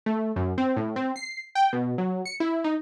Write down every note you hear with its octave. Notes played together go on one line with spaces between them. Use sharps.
A3
F#2
C4
A2
C4
C7
G5
B2
F#3
C#7
E4
D#4